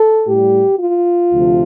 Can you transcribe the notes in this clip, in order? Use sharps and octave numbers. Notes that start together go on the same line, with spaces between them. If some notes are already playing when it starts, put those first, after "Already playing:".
Already playing: A4
A2 G3 G4
F4
D2 C3 F3